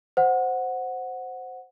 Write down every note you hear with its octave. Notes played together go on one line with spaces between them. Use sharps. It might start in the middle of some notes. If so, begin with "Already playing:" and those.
C5 F#5